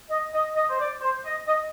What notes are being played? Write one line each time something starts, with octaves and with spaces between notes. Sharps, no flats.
D#5
D#5
D#5
C5
D5
C5
D#5
D#5